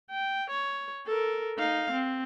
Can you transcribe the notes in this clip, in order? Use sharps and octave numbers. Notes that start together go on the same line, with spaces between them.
G5
C#5
A4 A#4
D#4 F5
C4